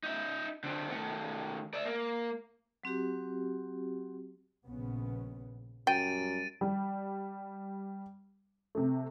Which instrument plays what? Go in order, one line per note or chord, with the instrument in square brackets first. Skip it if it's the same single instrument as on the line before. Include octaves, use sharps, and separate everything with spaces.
[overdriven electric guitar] D#4 E5
D3 C4
D#3 A3
D5 E5
A#3
[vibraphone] F#3 C4 F#4 G4
[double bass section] A#1 C#3 B3
[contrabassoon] F#2 [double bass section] G3 [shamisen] G5 [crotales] A6 D7 D#7
[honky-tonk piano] G3
C3 A3